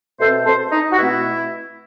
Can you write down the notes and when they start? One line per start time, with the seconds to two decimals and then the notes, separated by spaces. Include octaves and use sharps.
0.19 B2 A3 C4 A4 C5
0.46 A4 C5
0.71 D#4
0.92 F#4
0.98 B2 A3 C4 E4